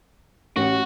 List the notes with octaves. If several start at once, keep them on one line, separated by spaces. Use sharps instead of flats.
A1 F#4